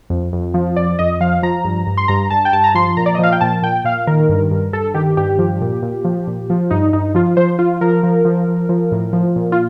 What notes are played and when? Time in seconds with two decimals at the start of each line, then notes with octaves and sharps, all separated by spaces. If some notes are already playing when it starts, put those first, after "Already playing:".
0.10 F2
0.33 F2
0.54 F3
0.76 F2 D5
0.99 F2 D#5
1.21 F3 F5
1.43 F3 A#5
1.64 G2
1.87 G2
1.97 C6
2.08 G2 A#5
2.30 G2 A5
2.45 G5
2.53 G2 A5
2.64 A#5
2.75 F3 C6
2.97 A#2 A#5
3.06 D5
3.15 D#5
3.19 F3 F5
3.32 G5
3.41 A#2 A5
3.63 A#2 G5
3.84 A#2 F5
4.07 D#3 A#4
4.29 G2
4.51 G2
4.73 G2 A4
4.94 D#3 G4
5.17 G2 G4
5.38 F3
5.61 A#2
5.82 A#2
6.05 F3
6.27 A#2
6.50 F3
6.71 G2 D#4
6.93 G2 D#4
7.15 F3 F4
7.37 F3 C5
7.59 F3 F4
7.81 F3 A#4
8.03 F3
8.25 F3
8.48 F3
8.69 F3
8.92 A2
9.13 F3
9.36 A#2
9.52 F4